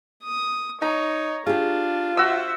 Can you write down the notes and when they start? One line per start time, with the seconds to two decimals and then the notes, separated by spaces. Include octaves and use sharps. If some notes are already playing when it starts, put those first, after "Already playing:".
0.23 D#6
0.82 D#4 C#5 A#5
1.47 D4 F4 G4 G#4
2.17 F#4 C5 E5 E6